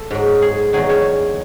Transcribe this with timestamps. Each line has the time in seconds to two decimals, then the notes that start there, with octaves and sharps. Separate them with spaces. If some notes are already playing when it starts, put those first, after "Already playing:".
Already playing: A4
0.11 G#2 F#3
0.42 G#4
0.73 E2 D#3 F#3 G#4
0.89 C#5